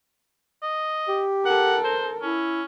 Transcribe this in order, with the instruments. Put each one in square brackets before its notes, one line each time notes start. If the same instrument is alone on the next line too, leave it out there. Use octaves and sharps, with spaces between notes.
[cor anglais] D#5
[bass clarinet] G4
[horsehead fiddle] A4 A#4 [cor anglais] F#5
[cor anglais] C5
[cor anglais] C#4 [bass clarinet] E4